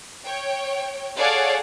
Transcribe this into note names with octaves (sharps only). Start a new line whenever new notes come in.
C#5 G5
G#4 A4 C#5 D5 F5 F#5